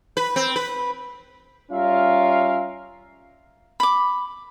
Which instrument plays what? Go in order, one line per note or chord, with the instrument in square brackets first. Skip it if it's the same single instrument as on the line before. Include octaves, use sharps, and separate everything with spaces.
[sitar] B4
C4
B4
[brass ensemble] G3 C#4 F4 A#4 E5 F5
[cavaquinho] B5 D6